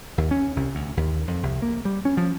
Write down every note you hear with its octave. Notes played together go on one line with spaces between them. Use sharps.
D#2
C#4
C2
D2
D#2
F2
C2
A#3
G3
C#4
F3